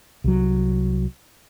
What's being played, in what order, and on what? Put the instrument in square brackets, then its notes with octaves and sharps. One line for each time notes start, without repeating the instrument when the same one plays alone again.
[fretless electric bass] C2 F#3